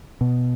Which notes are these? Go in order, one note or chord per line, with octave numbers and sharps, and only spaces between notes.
B2